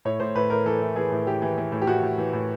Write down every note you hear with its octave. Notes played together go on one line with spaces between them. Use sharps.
A2 C#5
A2 C5
A2 B4
A2 A#4
E3 A4
E3
E3 G#4
A2
E3 G4
E3
E3
A2
G4
A2 F#4
A2
E3
A2